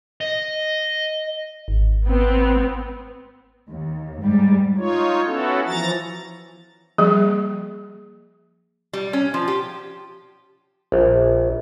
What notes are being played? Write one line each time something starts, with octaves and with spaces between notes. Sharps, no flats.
D#5
G#1
B3 C4
D#2
G#2 G3
D#4 F4 C#5
B3 C#4 E4 F#4 A4
E3 F3 A#5 A6
F3 G3 A#3 G#4
G3
C#4
F3
G4
A#1